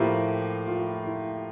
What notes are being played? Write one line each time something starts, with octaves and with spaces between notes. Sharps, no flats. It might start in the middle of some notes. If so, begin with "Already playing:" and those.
Already playing: A2 F3 A#3 E4 G4
F4
E4